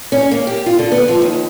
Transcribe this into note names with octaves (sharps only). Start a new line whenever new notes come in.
C#4
A#3
G4
F4
D3
B3
F3
D#2